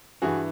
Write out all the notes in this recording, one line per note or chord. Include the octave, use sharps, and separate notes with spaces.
G2 E3 F#4 G#4